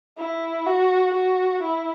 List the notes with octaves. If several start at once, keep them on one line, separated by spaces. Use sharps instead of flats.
E4
F#4
F#4
E4